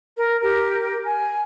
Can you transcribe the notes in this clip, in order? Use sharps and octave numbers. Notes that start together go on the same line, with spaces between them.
A#4
G4 A#4
G#5